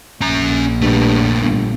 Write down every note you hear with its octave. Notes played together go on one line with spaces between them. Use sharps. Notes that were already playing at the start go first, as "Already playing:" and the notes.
A#1 C#4 A#5
G2 A#2 A3
G1